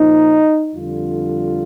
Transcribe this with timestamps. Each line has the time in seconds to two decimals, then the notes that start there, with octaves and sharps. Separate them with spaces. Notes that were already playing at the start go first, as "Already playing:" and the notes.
Already playing: A#2 F3 D#4
0.74 F2 D3 G3 F4